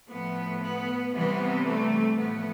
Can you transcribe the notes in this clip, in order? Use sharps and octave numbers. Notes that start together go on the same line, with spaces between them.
A2 F3 A3 B3
B3
C3 E3 G3 B3
A3
A2 F3 A3 B3